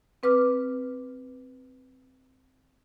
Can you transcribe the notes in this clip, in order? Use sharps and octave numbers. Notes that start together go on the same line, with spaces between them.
C4 B4 D6 F6